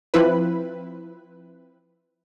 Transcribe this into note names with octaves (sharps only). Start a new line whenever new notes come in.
F3 C4 E4 B4